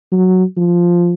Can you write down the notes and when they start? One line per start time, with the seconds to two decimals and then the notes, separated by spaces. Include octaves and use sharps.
0.12 F#3
0.57 F3